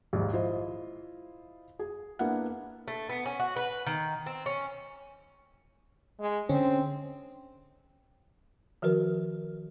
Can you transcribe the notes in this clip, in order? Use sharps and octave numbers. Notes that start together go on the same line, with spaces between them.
A#1 D#2 G#2
E4 F4 C5 D#5
G#4
A#3 B3 D4 E4 F#5
A3
B3
C#4
F#4
B4
D#3
C4
C#4
G#3
D3 C4 C#4
D#3 F3 F#4 A#4 B4